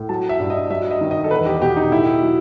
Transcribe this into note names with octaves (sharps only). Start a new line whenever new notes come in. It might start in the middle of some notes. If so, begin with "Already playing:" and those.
Already playing: A2
F#3 A5
E5
G2
D#5
F#3 E5
D#5
D#3
D#5
A4
E2 B4
G4
B2 G4
D#4
A2 E4
F#3